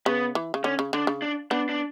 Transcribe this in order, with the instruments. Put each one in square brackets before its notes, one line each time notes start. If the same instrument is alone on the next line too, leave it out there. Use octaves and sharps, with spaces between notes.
[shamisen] C#3 [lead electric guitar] B3
[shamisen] E3
C#3
[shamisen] D3 [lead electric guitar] C#4
[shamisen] C#3
[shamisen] D3 [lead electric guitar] D4
[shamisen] C#3
[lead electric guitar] D4
[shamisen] B3 [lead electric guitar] D4
[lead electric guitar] D4